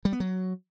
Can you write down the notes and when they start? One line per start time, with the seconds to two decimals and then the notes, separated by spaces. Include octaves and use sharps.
0.05 G3
0.13 B3
0.20 F#3